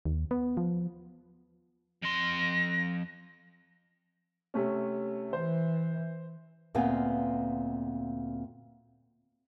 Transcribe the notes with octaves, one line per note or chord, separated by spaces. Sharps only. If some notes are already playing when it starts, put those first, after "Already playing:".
D#2
B3
F3
F2 C6 A#6
C3 A3 C#4
E3 C5
D2 A#2 B3 C4 F5 G#5